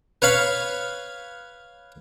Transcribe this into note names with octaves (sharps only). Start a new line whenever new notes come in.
B4 C#5 F5 B5